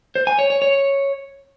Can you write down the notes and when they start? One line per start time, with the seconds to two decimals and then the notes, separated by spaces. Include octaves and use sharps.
0.15 C5
0.27 G#5
0.39 C#5
0.50 C#5
0.62 C#5